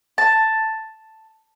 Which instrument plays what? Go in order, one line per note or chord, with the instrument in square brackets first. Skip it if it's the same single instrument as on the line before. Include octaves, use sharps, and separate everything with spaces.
[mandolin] A5